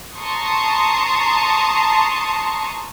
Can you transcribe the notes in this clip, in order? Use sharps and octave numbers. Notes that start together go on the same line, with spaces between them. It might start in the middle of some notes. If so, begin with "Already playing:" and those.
A5 A#5 C6 C#6 D#6